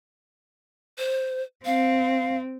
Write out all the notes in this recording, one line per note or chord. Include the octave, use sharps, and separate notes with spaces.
C5
C4 F5